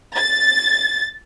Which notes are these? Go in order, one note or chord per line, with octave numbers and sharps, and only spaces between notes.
A6